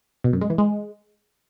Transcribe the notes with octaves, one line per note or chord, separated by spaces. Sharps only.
B2
F#2
G#3
E3
G#3